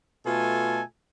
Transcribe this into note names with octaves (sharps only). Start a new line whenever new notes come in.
B2 A3 F4 A4 G#5